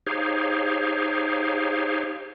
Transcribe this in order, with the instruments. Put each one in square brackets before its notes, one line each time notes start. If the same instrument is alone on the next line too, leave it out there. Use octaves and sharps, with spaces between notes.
[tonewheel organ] D#4 G4 G#4 C5 C#5 F5